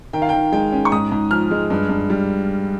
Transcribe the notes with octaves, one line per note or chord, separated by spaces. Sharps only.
D#3 G5
F5
D#3 G5
G#3 G5
C#4
C#6
G#2 D#6
G#2
F3 F6
G#3
G2
G2
G3